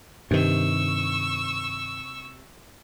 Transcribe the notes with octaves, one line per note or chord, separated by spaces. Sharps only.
G2 C3 D#3 C#6 E6